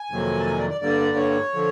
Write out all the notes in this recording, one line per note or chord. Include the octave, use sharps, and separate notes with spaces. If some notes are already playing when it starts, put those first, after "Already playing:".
Already playing: G#5
F2 C3 D#3 F#3 A#3
A5
G#5
D5
D5
G2 D3 G3 A#3 D5
C#5
D3 F3